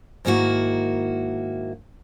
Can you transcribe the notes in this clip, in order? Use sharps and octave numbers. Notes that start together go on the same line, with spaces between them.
G#2 D#3 A#3 E4 F#4